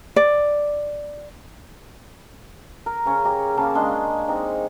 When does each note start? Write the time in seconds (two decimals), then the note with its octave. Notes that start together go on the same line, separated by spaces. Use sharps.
0.16 D5
2.86 A#4
3.06 C#3 C#4
3.25 G4 A#5
3.57 C#3 A#3 F5 A5
3.75 G#3 D4 D#5 C6
4.28 C4 D#4